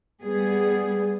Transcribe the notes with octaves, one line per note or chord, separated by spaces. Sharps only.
G3 B3 G#4